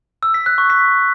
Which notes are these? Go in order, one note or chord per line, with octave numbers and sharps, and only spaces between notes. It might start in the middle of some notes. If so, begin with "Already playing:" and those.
E6
B6
F#6
C#6
B6